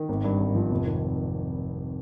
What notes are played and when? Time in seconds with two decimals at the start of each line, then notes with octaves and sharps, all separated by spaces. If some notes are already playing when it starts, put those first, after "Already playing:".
Already playing: D#3
0.09 G#1
0.24 G2
0.40 G#1
0.55 F3
0.71 F1
0.86 D#3